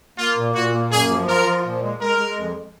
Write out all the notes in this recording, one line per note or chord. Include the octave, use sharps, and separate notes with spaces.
A#3 F4
A#2
A#2 F#4
A#3
F#2 G#4
F3
F4 A#4
F3
A#2
G#3
G#3 A#4
G#3
F2